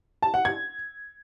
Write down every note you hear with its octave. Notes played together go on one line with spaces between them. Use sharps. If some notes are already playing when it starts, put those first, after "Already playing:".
A5
F#5
G#6